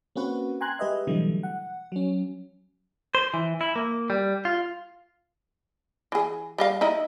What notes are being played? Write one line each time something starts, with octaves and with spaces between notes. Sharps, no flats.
A#3 C4 C#4 F#4 B4 F#5
G5 G#5 A#5 C6 F#6 G#6
G#3 G4 B4 D#5 E5
B2 D3 E3 F#3 G3 A3
F#5
F#3 C#4
C5
E3
E4
A#3
G3
F4
E3 G#4
G3 D#5 F5
D#4 E4 D#5